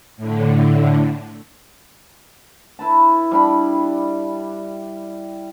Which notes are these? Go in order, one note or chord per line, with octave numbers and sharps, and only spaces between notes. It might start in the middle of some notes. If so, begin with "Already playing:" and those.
A2 D3
E4 B4 A5
G3 D4 B5